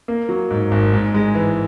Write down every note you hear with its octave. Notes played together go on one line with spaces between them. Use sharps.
A#3
F#3
G#2
G#1
G#2
G#3
E3